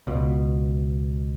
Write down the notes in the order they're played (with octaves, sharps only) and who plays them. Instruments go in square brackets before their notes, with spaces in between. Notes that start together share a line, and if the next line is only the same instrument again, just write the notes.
[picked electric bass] C#2 B2